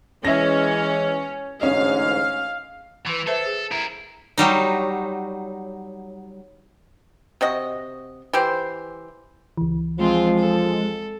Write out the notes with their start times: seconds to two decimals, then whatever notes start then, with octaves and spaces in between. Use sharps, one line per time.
0.25 E3 G#3 C#4 E5 A#6
1.61 A1 D2 G#2 C#4 D#5 F5
3.07 E3 B4 C6
3.27 A4 B4 C5 E5
3.46 G#4
3.72 E4 A#4 E5
4.38 F#3 G3 D#4
7.41 C3 F#4 D#5
8.33 E3 G4 C5
9.57 C#2 E3
9.99 F3 G#3 C4 F4
10.38 A4